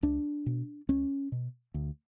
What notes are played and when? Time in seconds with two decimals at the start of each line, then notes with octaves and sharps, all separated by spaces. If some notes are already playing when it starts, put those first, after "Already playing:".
0.03 C#2 D4
0.46 B2
0.89 C#2 C#4
1.32 B2
1.74 D2